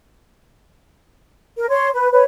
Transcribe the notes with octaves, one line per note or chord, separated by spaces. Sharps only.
A#4
C#5 C6
B4
B4 C#5